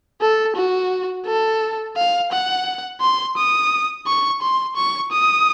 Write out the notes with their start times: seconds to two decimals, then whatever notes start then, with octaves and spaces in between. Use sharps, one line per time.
0.21 A4
0.56 F#4
1.26 A4
1.96 F5
2.32 F#5
3.01 C6
3.37 D#6
4.06 C#6
4.42 C6
4.76 C#6
5.12 D#6